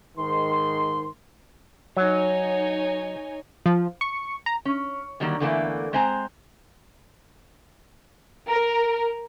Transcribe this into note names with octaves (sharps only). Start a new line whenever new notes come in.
G#2 D#3 C6
F#3 D#4 C#5 G#5
F3
C#6
A#5
C#4
D3 D#3 F#3 G3 A#3
E2 D3 E3 A3 A#3
G#3 C4 C5 G#5 A#5
A#4